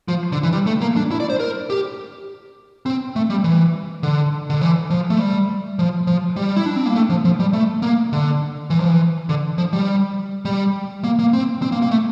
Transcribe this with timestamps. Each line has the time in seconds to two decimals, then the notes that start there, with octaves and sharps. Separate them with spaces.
0.08 F3
0.32 D3
0.43 E3
0.53 G3
0.66 A3
0.81 A#3
0.96 D4
1.11 E4
1.20 D5
1.30 C5
1.40 A#4
1.70 G4
2.86 C4
3.16 A3
3.30 G3
3.44 E3
4.03 D3
4.50 D3
4.61 E3
4.90 F3
5.10 A3
5.19 G3
5.79 F3
6.07 F3
6.36 G3
6.56 E4
6.66 D4
6.76 C4
6.86 A#3
6.96 A3
7.10 F3
7.25 F3
7.40 G3
7.53 A3
7.82 A#3
8.13 D3
8.70 E3
8.80 F3
8.88 E3
9.29 D3
9.58 F3
9.73 G3
10.45 G3
11.04 A#3
11.19 A#3
11.33 C4
11.62 C4
11.72 A#3
11.82 A#3
11.91 A3